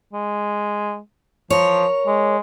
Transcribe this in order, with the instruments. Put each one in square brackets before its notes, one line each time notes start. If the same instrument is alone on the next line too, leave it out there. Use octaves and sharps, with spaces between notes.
[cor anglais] G#3
[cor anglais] F3 [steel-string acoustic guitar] A#4 C#5
[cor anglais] G#3